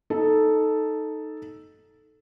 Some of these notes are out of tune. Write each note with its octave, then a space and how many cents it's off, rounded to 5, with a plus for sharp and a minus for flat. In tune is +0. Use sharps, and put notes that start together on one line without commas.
D#4 +0 A4 -5